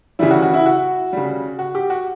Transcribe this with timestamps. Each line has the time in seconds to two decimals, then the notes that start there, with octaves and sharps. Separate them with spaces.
0.19 C#3 E3 G3 E4
0.31 F#4
0.42 F#4
0.54 E4
0.66 F#4
1.13 C#3 G3
1.59 F#4
1.75 G4
1.90 F#4